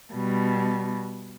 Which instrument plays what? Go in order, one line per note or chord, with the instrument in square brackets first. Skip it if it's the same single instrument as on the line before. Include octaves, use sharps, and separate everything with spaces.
[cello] B2 G3